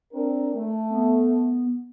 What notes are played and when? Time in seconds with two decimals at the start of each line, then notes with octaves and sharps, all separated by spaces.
0.13 C4 D4 A#4
0.54 A3
0.90 B3